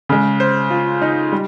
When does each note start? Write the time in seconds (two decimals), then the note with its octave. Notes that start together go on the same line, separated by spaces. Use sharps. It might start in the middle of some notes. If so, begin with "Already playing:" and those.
0.09 C#3 G#3
0.40 C5
0.70 F4
1.02 D#4
1.32 G3